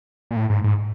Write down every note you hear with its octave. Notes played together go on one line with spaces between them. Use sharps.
A#2
A2
G#2
G#2